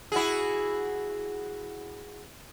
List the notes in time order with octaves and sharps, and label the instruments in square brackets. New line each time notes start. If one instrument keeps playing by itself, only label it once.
[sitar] E4 F#4 G#4